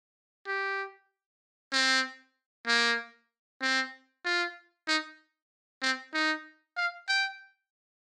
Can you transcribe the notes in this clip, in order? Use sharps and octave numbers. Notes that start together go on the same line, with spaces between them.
G4
C4
A#3
C4
F4
D#4
C4
D#4
F5
G5